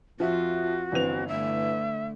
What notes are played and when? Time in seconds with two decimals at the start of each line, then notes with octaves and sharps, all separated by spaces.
0.20 F2 F3 F4 F#4 E5
0.92 G1 E3 C4 F7
1.28 D3 A3 E5